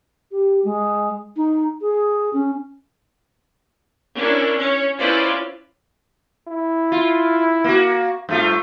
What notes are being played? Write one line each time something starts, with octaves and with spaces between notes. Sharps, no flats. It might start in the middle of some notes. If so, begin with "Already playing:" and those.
G4
G#3
D#4
G#4
C#4
C#4 D4 E4 A#4
C#4 C#5
C#4 E4 F4 B4 C5 D5
E4
F4
A#3 F#4
G2 A3 F4